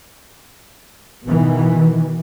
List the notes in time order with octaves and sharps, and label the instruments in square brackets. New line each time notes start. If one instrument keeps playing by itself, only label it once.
[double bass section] B2 D#3 E3